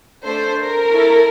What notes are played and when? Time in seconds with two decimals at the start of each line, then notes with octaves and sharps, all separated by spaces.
0.23 A3 D4 A4 C5
0.56 A#4
0.89 A3 E4 A4